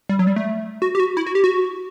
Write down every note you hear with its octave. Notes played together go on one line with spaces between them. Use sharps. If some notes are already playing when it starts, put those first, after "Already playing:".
G3
F#3
G3
A3
F#4
G4
F#4
E4
F#4
G4
F#4